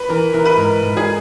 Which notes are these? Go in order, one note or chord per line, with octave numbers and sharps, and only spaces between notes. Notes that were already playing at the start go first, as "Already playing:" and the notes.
Already playing: B4
E3 A#4
E3 A#4
B4
G#2 A#4
G#2
G#4